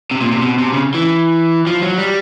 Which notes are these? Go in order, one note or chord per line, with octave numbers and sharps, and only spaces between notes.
C3
A#2
C3
B2
C3
C#3
E3
F3
F#3
G3